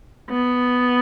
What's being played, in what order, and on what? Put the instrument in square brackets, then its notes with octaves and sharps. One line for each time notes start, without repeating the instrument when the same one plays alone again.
[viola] B3